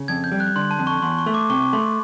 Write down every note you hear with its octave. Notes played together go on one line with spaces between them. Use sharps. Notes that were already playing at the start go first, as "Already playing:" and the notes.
Already playing: C#3
F2 G#6
G6
G3
F#6
D3 C6
A5
F2
C#6
E2 C6
C#6
A3
D6
C3 C#6
A3 C6